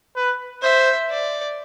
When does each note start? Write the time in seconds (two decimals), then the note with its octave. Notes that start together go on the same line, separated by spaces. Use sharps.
0.16 B4
0.62 C5 E5
1.10 D5